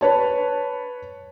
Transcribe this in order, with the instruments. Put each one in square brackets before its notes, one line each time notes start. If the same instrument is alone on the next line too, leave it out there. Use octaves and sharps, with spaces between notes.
[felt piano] B4 C#5 A5